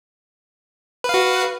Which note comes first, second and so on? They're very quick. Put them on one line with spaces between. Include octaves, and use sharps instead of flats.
B4 F5 F#4